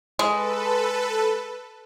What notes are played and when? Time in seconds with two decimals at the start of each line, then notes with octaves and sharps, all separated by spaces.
0.19 G#3 A4 B4